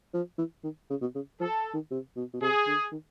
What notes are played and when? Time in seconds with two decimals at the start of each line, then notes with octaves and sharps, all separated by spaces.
0.14 F3
0.39 E3
0.64 D#3
0.90 C#3
1.02 B2
1.15 C#3
1.40 F3 A4
1.74 D#3
1.91 C3
2.16 B2
2.34 B2
2.41 C3 G#4
2.67 D3
2.92 D#3